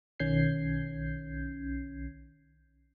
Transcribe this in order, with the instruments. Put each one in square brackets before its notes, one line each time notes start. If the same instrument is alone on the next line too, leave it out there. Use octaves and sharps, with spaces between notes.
[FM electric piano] B1 D#3 C#4 G6 G#6 C7